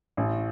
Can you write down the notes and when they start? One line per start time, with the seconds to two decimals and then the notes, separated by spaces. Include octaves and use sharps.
0.17 A1